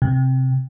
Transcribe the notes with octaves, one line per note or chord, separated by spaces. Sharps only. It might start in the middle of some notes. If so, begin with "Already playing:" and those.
C3